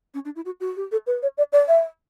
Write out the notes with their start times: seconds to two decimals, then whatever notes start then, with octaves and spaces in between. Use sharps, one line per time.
0.14 C#4
0.25 D4
0.36 E4
0.45 F#4
0.60 F#4
0.77 G4
0.92 A4
1.07 B4
1.23 C#5
1.38 D5
1.53 D5
1.68 E5